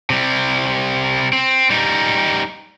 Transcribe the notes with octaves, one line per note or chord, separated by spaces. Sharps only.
C3 G3
C4
G3 D#4